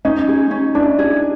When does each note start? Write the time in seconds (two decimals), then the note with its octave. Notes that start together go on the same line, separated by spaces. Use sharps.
0.05 C#4 D#4
0.28 G#4
0.51 C#4
0.75 D4 E4
0.99 G#4